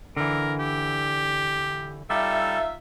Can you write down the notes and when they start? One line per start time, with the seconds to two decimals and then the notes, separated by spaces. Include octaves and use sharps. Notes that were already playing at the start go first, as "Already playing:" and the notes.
0.17 D3 E3 A#4
0.59 G4
2.10 G3 D#4 F4 A4 E5